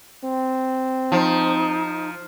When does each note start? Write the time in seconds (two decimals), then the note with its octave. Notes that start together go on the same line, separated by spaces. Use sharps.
0.24 C4
1.12 F3 D#4